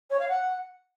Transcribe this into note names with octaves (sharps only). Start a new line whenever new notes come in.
C#5
F5
F#5